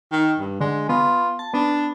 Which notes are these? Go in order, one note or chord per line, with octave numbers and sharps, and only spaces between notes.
D#3
G2
D3 G#3
B3 F4
A5
B3 D4